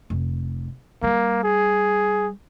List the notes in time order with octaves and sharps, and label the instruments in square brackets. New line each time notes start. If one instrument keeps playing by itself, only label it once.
[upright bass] F1
[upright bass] G3 [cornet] A#3
[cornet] G#4